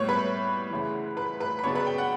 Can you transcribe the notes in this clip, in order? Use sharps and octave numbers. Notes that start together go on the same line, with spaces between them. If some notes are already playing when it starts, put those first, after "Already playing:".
Already playing: A2 G3 B3 C#5 C#6
B4 B5
D2 C#3 E3
B4 B5
B4 B5
B5
C#3 F#3 B3 D4 C#5 C#6
B4 B5
G5
F#5